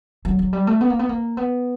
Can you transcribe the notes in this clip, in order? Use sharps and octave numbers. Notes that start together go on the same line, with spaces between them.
F#3
F#3
G3
A3
B3
A#3
B3
A#3
B3